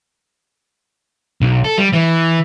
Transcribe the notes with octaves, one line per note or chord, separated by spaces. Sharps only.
B1
A4
G3
E3